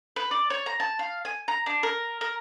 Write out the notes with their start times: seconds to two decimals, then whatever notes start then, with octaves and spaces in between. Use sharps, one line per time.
0.16 B4
0.31 D5
0.50 C#5
0.66 A#5
0.80 A5
0.99 F5
1.25 G#5
1.48 A#5
1.66 D4
1.83 A#4
2.21 A#4